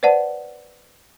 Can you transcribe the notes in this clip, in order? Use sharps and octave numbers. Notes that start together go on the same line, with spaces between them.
B4 C5 D5 F#5 A5